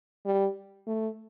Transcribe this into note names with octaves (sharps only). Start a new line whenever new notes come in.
G3
A3